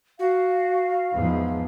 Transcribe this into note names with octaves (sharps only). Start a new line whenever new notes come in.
F#4 F5
E2 G#2 F3